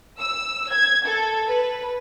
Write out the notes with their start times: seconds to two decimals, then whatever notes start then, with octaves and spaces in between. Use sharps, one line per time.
0.19 E6
0.70 G#6
1.05 A4
1.48 B4